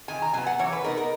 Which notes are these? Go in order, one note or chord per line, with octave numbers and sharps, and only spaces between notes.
D#3 G#5
A#5
F#3 B3 G#5
F#5
E3 C#5
B4
B3 D#4 A#4
A#4